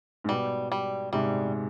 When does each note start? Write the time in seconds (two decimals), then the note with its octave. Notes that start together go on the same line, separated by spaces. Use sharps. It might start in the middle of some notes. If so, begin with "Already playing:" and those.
0.24 G#2
0.29 B2 G3
0.72 G3
1.13 G#2 C3 G3